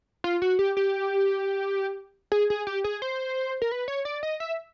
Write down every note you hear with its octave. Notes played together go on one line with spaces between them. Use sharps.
F4
F#4
G4
G4
G#4
G#4
G4
G#4
C5
A#4
B4
C#5
D5
D#5
E5